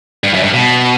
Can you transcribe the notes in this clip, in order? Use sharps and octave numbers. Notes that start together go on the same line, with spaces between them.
G2
F#2
G2
B2